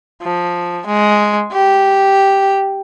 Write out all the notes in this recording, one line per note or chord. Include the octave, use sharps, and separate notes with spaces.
F3
G#3
G4